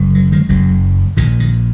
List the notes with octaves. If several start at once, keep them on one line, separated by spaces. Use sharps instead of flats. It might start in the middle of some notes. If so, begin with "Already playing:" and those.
Already playing: F#1 F#2 C#3
F#3
D#3 G#3
F#1 F#2 C#3 F#3
A#1 A#2 D#3
D#3